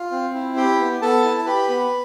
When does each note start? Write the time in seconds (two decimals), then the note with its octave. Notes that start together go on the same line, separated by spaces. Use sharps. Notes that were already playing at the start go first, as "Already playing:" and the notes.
Already playing: F4 F5
0.11 C4
0.34 E4
0.56 G4 G5
0.79 B3
1.02 B3 A4 A5
1.24 E4
1.38 A5
1.46 G4 B4 B5
1.69 B3